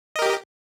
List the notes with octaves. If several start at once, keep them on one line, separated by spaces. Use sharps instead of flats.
G4 A#4 D#5